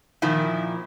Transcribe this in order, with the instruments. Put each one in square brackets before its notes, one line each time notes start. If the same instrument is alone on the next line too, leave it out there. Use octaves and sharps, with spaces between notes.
[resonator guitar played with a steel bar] A#2 D#3 F3 E4